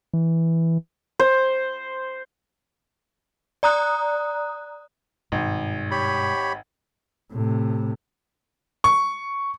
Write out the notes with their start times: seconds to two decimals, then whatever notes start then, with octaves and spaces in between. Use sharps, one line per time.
0.13 E3
1.19 C5
3.63 D5 A#5 D#6 F#6
5.32 G#1 G2 B2 G#3
5.91 G4 C#5 B5
7.32 A2 C3
8.84 C#6